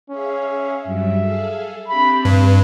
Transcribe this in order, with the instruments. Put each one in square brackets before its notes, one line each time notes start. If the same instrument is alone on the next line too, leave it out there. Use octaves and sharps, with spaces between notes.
[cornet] C#4 [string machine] G#4 E5 F5
[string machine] G2 F#3 G3 [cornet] E5
[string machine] G#4 A4 F5
[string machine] C4 D4 G4 [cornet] B5
[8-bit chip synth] G2 [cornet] B4